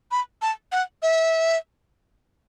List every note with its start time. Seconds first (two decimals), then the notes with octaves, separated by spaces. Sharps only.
0.11 B5
0.42 A5
0.72 F#5
1.02 E5